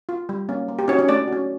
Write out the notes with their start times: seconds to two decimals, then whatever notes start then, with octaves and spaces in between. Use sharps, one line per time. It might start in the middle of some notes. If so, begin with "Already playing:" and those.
0.09 F4
0.29 G3
0.49 A#3 C#4
0.68 A#3
0.79 G4
0.88 C#4 D#4 F#4 C#5
0.98 C#4 C#5
1.08 A3 D4 D5
1.28 C#4 F#4